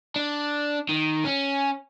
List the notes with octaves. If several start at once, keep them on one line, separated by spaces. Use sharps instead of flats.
D4
D#3
C#4